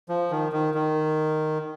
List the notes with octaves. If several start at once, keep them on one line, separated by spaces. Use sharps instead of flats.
F3
D#3
D#3
D#3